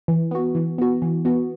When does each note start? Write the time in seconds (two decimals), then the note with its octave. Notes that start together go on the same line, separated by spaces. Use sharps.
0.08 E3
0.31 B3 F#4
0.55 E3
0.78 B3 F#4
1.02 E3
1.25 B3 F#4